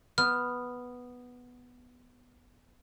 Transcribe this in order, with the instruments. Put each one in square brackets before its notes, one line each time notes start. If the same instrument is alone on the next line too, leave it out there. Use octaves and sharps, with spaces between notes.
[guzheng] B3 [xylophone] F6